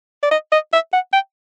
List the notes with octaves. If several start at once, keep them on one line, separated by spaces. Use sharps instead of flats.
D5
D#5
D#5
E5
F#5
G5